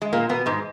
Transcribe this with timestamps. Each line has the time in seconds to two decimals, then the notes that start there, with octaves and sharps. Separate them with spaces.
0.02 G#3
0.13 A#2 A#3
0.29 B2 B3
0.46 G#2 G#3